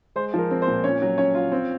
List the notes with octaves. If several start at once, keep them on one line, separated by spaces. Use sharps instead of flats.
G#3 C5
F3 A#4
C4
C5
A#2
C#4 C#5
F#3
C#4 C#5
F4
C4